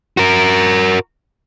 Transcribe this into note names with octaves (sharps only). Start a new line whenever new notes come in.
F#4 A#4